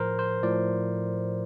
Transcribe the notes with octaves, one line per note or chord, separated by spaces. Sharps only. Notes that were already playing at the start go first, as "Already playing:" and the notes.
Already playing: A2 F3 A#4 C5
C5
A2 F3 D5